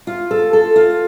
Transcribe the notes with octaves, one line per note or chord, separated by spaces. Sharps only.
F4
A4
A4
F4